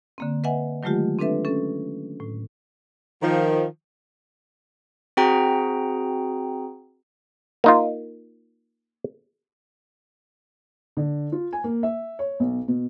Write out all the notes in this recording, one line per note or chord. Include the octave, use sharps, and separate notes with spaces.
D3 A#3 C4
B4 D#5 E5 F#5 G#5
D#3 F#3 G#3 A3 F4 G4
C4 D4 A4 B4 E5
C#4 A4
A2
D#3 F3
C4 F#4 G#4 F#5 G5 A#5
A#3 D#4 F4
D3
F4
G#5
A#3
E5
C#5
B1
B2